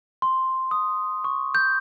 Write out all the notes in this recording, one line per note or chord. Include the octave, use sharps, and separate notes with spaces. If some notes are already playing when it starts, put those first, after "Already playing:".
C6
D#6
C#6
G6